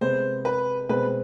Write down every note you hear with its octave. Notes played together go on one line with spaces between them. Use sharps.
C3 G#3 B3 C5
B4
B2 G#3 C4 B4